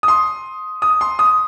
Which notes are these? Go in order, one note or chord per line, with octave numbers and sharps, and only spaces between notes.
D#6
C6
D#6
C6
D#6